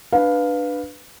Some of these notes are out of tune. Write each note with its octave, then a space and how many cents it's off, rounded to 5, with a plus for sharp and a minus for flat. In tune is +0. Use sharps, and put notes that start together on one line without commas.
D4 +10 B4 +0 F5 +10